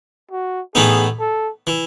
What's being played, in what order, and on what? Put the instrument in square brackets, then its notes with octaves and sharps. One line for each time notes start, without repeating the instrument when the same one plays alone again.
[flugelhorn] F#4
[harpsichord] A2 E3 B3 D#4 [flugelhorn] G#4
[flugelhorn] A4
[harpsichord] E3